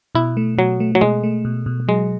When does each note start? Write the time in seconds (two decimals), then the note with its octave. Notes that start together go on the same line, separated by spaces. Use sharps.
0.15 B2 E4
0.37 A3
0.58 B2 F#3
0.80 A3
0.95 F#3
1.01 B2 G#3
1.23 A3
1.45 B2
1.66 B2
1.88 F#3 G#3